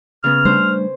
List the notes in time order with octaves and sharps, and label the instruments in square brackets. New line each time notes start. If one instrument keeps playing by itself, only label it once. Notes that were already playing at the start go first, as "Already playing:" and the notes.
[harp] C#3 B3 [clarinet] F6
[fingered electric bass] G3 A3 D4 [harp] C5